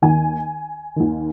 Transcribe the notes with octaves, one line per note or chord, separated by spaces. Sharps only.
D#2 D#3 G#5
D#2 D#3